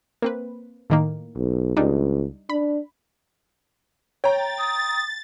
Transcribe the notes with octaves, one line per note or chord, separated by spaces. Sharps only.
A#3 C4 B4
A2 D#3 A#3
B1
C#2 G3 D4 D#4
D4 B5
C#5 G5 A#5 A6
D#6